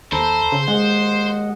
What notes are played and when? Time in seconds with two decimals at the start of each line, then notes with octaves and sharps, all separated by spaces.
0.12 D#2 A4 C5 A#5 B5
0.52 C#3
0.68 D#2 G#3 D#5 F#5